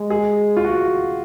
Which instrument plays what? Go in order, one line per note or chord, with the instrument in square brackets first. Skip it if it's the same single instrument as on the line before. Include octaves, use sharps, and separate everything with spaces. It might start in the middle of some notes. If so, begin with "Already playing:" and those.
Already playing: [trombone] G#3
[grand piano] G#4
F4
F#4